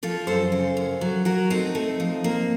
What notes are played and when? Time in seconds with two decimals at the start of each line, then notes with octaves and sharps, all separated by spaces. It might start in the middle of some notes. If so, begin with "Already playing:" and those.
0.03 F3 F4 A4
0.27 F#2 A4 C5
0.52 C#3
0.77 F#2
1.01 F#3
1.25 F#3 F#4 A#4
1.50 A3 C4 D#4
1.75 A3
2.00 F3
2.24 A#3